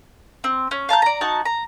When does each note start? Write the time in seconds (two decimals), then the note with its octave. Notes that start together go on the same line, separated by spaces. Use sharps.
0.44 C4
0.71 C#4
0.89 F5 A5 A#5 G6
1.02 D5 A#5
1.21 D#4 F#4 A5
1.45 A#5